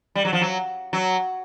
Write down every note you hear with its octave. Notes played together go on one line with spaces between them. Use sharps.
G3
F#3
F3
F#3
F#3